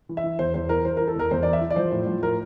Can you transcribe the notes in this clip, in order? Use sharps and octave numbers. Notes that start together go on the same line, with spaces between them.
E3
E5
E3
E2 C5
E2 C5
E3 A#4
E3 C5
E3 A#4
A4
E2 A#4
E2 C5
E3 D5
E5
E3
D5
F3 C5
A2
F3
A2 A#4